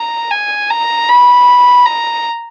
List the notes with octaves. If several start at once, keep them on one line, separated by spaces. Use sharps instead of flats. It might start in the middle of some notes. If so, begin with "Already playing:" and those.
Already playing: A#5
G#5
A#5
B5
A#5